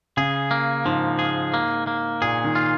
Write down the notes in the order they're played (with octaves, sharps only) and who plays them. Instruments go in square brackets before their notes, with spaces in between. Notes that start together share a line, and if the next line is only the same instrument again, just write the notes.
[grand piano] C#3 [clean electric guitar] G#4
[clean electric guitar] A#3
[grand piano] G#2 [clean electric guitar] F3
[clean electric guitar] G#4
A#3
A#3
[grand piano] A#2 [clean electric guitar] G#4
[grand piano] D#3
[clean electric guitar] F4